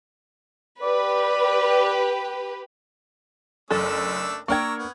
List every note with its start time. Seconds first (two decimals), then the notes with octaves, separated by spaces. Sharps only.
0.82 G4 B4 D5
3.71 F#1 A3 D4 A4 E6
4.48 A#3 D4 G5 A#5 C#6 E6 F6 G#6
4.78 B3